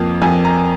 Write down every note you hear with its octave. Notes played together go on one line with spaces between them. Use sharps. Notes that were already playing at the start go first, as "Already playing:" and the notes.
Already playing: F2 F3 A#3
F2 G#5
A#5